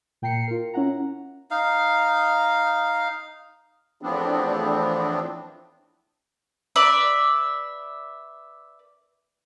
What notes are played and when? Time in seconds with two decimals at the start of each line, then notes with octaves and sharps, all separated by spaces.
0.22 A#2 G5 A#5 C7 C#7
0.47 F4 A#4
0.73 C#4 E4 F#5 A#5
1.51 D#4 F5
4.02 E2 A2 F3 B3 C4 D4
6.76 B4 D5 E5